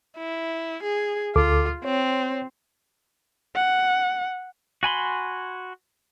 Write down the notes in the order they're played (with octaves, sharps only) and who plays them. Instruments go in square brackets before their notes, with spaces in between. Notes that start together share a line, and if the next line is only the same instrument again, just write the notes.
[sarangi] E4
G#4
[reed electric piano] D2 A4 D6 [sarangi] F4
[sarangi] C4 [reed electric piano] C#5
[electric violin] F#5
[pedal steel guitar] F#4 G#5 B5 C6